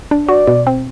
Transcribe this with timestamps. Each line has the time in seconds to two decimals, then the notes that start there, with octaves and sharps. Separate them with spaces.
0.11 D4
0.29 F#4 D5
0.47 B2
0.67 C4